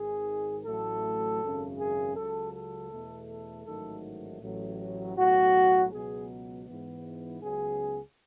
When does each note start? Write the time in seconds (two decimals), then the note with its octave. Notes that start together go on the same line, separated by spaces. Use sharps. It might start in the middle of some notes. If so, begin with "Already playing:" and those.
Already playing: G#1 G#2 D#3 G#4
0.65 A1 A2 F#3 A3 A4
1.41 G#1 F#2 C#3
1.78 G#4
2.16 C#2 C#3 F#3 A4
2.54 A4
2.91 E2 B2 A3
3.29 A4
3.66 A1 G#2 D#3 F#3 A3 A4
4.41 A1 A2 F#3
5.17 B1 A2 F#3 F#4
5.91 C#2 B2 F#3 B3 G#4
6.66 G#2 E3 B3
7.42 C#2 C#3 F#3 B3 G#4